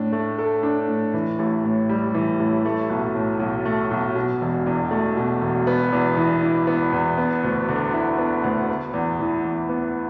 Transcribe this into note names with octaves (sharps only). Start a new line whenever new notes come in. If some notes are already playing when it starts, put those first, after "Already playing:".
Already playing: A2 D4
A3
A4
D4
A2
E3
A1
A2
G3
E3
A1
A3
B1
A2
B1
A3
B1
B2
E1
E2
A3
B2
E1
B3
E2
E3
E4
B3
E2
B3
D2
D3
E4
B3
D2
B3
E2
E3
E2
B3